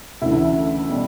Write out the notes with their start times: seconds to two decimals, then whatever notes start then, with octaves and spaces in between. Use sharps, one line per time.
0.22 D2 C#3 E3 E4
0.89 B2 G3